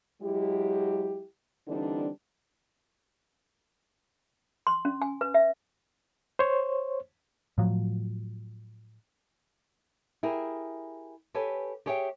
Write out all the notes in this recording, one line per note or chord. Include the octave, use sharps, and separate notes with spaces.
F#3 G#3 E4 G4
D3 E3 G3 C4 D4 D#4
C6
C#4
G#5
B4
E5
C5 C#5
A2 F3 F#3
E4 G4 G#4 A#4
G4 A4 B4 C#5 G#5
G4 G#4 C#5 E5 F#5 G5